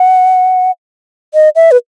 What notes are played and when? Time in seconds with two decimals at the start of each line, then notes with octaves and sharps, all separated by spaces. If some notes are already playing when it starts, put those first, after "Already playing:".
Already playing: F#5
1.34 D#5
1.56 E5
1.71 B4